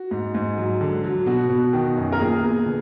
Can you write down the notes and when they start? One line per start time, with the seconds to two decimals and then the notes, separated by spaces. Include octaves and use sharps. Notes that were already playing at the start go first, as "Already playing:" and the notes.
Already playing: F#4
0.11 G#2
0.35 G#2
0.57 F#3
0.81 D3
1.04 F#3
1.26 B2 F#4
1.50 B2
1.73 D#3
1.97 F#2
2.12 A#4
2.20 A#2 G#4
2.44 B3
2.66 D3